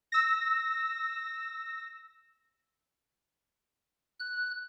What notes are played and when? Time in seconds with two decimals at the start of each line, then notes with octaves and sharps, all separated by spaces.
0.12 E6 A#6
4.20 F#6